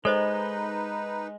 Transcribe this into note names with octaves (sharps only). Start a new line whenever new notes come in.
G#3 D#4 A4 B4 C5 D#5